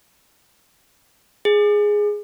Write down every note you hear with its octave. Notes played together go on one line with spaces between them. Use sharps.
G#4